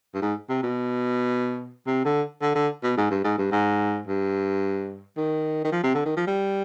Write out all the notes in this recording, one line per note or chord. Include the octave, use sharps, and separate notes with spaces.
G2
G#2
C3
B2
C3
D3
D3
D3
B2
G#2
G2
G#2
G2
G#2
G2
D#3
D#3
F3
C3
D3
D#3
F3
G3